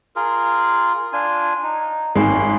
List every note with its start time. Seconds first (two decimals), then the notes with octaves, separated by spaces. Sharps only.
0.16 F4 G#4 A#4
1.13 D4 F4 G#5
1.63 D#4
2.15 G#1 G#3 C#4 B5 C6